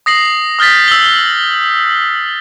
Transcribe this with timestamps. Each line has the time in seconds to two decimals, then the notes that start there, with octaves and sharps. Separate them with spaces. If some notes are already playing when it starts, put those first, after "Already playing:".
0.06 D#6 A#6 C7 F#7
0.59 D#6 F6 G6 A6 B6
0.88 E6 G7